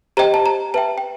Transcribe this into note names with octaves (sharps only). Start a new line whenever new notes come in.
G4 C5 D#5 G5 A#5
A5
A#5
B4 E5 G5 A5
G5